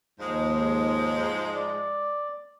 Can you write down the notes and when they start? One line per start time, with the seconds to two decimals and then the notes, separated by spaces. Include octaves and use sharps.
0.20 D#2 G#2 F3 G#3
1.54 D5